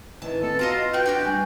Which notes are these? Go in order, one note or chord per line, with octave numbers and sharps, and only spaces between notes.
D#3 E3 A5
B3 C4 A4
F4 F#4 D#5 A5 A#5
F4 B4 F#5 G5
D4 F#4 G4 D5
G3 G#5